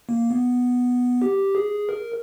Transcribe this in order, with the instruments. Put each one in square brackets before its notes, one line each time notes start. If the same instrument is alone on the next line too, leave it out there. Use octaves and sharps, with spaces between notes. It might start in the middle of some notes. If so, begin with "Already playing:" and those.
[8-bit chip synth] A#3
B3
G4
G#4
A#4